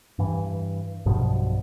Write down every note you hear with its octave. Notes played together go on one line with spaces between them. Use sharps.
G2 E3
B1 G2 B2 F3